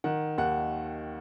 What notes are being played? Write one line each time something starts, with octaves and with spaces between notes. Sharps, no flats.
D#3 F#5
D#2 F#5